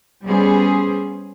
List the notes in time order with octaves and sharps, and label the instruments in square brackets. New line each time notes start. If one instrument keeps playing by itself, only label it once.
[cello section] G3 B3 C#4 G#4 C5